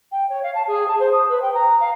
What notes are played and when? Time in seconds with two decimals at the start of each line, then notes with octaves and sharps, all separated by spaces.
0.12 G5
0.30 C#5
0.43 F5
0.55 A5
0.67 G#4
0.88 A5
1.00 C5
1.13 D#6
1.29 B4
1.42 G5
1.54 A#5
1.81 F5